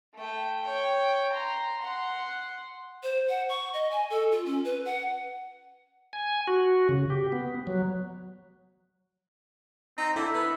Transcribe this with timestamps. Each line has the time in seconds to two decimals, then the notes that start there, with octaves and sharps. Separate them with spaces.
0.15 A3 G5
0.63 C#5 G5
1.33 A#5 C6
1.83 F#5 C6
3.03 C5
3.29 F#5
3.49 C#6
3.73 D#5
3.91 G#5
4.10 A4
4.32 F4
4.46 C#4
4.64 B4
4.85 F#5
6.13 G#5
6.47 F#4
6.89 C#3
7.10 G4
7.32 B3
7.67 F#3
9.98 C4 D#4
10.16 D3 E4 E5
10.34 B3